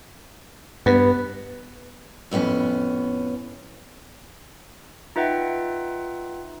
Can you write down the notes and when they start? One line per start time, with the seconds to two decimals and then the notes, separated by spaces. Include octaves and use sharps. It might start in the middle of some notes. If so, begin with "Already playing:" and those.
0.86 G2 B3
2.31 F2 A2 B3 C#4
5.16 D#4 F4 B4 E5 F#5 G5